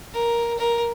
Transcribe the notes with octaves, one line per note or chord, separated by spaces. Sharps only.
A#4
A#4